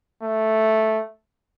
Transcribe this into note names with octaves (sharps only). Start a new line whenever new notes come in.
A3